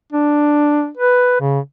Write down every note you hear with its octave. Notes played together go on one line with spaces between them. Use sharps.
D4
B4
C#3